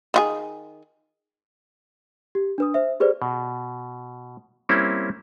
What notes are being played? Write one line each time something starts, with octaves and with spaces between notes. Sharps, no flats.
D#3 F4 G#4
G4
D4 B4 D#6
C5 E5
G4 G#4 B4 C5 D5
B2
G3 A#3 C4 C#4 E4